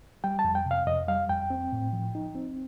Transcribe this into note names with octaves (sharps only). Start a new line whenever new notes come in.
G3 G5
A5
F2
G5
C3
F5
F2 D#5
G3 F5
F2 G5
C4
A2
F3
D#4
C4